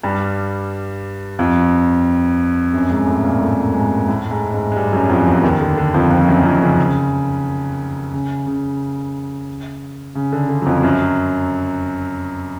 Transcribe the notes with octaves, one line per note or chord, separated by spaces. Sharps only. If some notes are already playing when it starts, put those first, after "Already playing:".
G2 G3
F2 F3
F#2 F#3
G#2 G#3
A2 A3
A#2 A#3
A2 A3
G#2 G#3
A2 A3
G#2 G#3
G#2 G#3
G#3
G2 G3
F#2 F#3
F2 F3
E2 E3
D#2 D#3
D3
D3
F2 F3
F2 F3
F#2 F#3
F2 F3
C#3
C#3
C#3
C#3
D3
D3
F#3
F2 F3
F#2 F#3